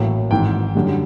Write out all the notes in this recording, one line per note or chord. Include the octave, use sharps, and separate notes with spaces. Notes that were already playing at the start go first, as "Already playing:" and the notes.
Already playing: A1 A2 F#3 A#3
G#1 G#2 E3 G5
F#2 D3 G3